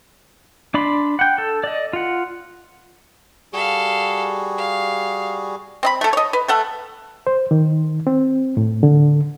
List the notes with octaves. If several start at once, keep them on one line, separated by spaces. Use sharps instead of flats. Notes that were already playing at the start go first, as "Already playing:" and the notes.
D4 D5 B5 C6
F#5 G5
A4
D5 D#5
F4 F#5
G3 F#4 G#4 A4 F5
F5
C4 D#5 B5
A3 A4
C#5 D#5
B4
A3 A4 F#5
C5
D#3
C4
A2
D3